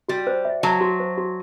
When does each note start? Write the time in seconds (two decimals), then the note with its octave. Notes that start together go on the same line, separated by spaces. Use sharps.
0.09 G3 F#4
0.27 C5
0.45 E5
0.63 F#3 A5
0.81 F#4
1.00 C5
1.18 F#4